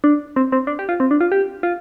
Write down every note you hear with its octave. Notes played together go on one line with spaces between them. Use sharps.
D4
C4
C4
D4
G4
F4
C4
D4
F4
G4
F4